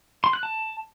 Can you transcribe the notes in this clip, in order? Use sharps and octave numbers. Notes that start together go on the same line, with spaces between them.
C6
F#6
A5